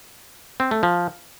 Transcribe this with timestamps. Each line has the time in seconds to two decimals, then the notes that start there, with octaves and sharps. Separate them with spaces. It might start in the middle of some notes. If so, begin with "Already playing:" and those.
0.60 C4
0.71 A3
0.83 F3